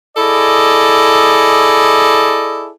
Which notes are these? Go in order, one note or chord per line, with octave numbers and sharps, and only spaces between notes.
E4 G#4 A4 D5 D#5